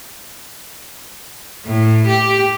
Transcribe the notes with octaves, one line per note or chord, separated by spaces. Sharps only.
A2
G4